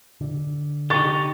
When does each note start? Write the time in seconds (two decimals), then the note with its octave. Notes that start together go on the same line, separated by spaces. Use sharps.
0.21 D3
0.90 D#4 G4 C#6 A6